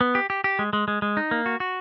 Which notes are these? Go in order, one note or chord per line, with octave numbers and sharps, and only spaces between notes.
B3
G4
G4
G4
G#3
G#3
G#3
G#3
D#4
A#3
F#4
F#4